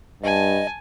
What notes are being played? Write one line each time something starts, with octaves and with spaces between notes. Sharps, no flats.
G2 D#5 G#5 A5